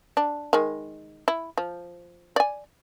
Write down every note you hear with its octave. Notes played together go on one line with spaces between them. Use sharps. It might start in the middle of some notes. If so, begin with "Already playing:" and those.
D4
D#3 G#3
E4
F3
D5 G#5